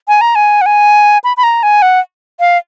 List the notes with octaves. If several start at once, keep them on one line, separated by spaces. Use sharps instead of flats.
G#5
A#5
G#5
F#5
G#5
B5
B5
A#5
G#5
F#5
F5